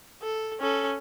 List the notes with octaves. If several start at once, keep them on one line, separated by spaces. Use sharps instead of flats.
A4
C#4 A4